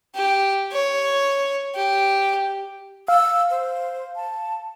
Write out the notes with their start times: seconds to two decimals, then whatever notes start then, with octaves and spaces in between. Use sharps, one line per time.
0.15 G4
0.72 C#5
1.75 G4
3.08 F5 E6
3.51 C5
4.16 A5